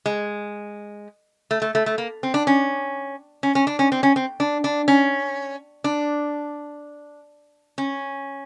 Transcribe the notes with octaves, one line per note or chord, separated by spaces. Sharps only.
G#3
A3
A3
A3
A3
A#3
C4
D4
C#4
C#4
C#4
D4
C#4
C4
C#4
C4
D4
D4
C#4
D4
C#4